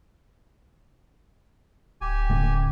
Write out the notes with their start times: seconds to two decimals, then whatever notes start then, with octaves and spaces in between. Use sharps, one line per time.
2.01 D1 G4 G#5
2.30 G#2 C#3 A3